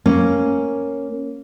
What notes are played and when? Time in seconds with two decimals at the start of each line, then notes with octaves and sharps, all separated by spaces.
0.06 A#3 C#4